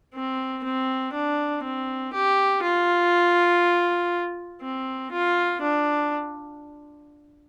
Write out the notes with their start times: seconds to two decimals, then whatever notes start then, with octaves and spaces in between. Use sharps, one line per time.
0.14 C4
0.64 C4
1.14 D4
1.64 C4
2.14 G4
2.63 F4
4.62 C4
5.12 F4
5.62 D4